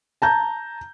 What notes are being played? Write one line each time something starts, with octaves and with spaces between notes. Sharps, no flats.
A5 A#5 G6